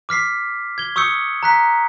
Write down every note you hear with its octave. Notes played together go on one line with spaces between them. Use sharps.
D6 F6 B6 C7
G#6 G7
C#6 D#6 E6 G6 C#7
A#5 F#6 B6